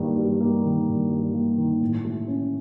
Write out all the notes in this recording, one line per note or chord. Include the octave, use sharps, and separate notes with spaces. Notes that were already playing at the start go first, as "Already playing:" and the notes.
Already playing: G2 D#3 G3 A#3
G3
A#3
D#3
G2
G3
A#3
D#3
A2
A3
C#4